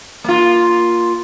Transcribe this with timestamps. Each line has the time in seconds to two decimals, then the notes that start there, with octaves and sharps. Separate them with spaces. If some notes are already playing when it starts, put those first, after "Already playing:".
0.24 A#3 F4